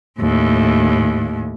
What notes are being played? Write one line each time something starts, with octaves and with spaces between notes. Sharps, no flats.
D#2 A2